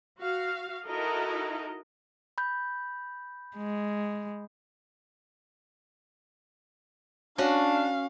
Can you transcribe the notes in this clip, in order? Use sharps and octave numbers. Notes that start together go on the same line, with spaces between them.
F#4 F5
D#4 E4 F#4 A4 A#4 D#5
B5 G6
G#3
C#4 D4 F#4 F5